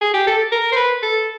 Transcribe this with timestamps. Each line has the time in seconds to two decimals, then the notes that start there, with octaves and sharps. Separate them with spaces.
0.01 G#4
0.14 G4
0.27 A4
0.52 A#4
0.72 C5
0.76 B4
1.03 A4